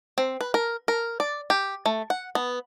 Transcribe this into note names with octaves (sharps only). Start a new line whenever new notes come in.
C4
B4
A#4
A#4
D5
G4
A3
F#5
B3